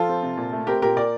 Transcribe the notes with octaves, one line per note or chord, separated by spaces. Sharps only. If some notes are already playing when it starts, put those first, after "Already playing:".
Already playing: F3 F4 A4
C4
C3
A#2
A3
C4 G4 A#4
A#2 G4 A#4
A#2 A#4 D5